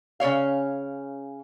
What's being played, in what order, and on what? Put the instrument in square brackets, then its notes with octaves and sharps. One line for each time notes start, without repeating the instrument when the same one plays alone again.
[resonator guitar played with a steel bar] C#3 C#4 C#5 F5